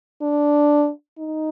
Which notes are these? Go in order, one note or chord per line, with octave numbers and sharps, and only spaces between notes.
D4
D#4